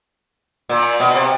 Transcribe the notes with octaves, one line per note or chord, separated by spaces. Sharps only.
A#2
B2
C3